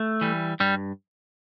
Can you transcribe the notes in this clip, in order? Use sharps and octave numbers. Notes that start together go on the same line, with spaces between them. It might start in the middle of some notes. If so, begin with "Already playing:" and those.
Already playing: A3
E3 G3
G2 G3